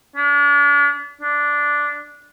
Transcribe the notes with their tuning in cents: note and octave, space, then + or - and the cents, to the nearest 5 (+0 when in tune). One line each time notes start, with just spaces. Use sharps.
D4 -35
D4 -5